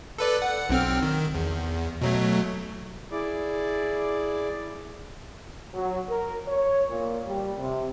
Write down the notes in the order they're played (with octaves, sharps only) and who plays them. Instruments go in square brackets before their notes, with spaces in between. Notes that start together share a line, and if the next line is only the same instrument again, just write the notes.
[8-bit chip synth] A4 B4 D5
F#5
B1 C4 F6
D#3
E2
B2 F#3 A3
[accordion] E4 G#4 D5 D6
[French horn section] F#3
A#4
C#5
A#2
G3
C3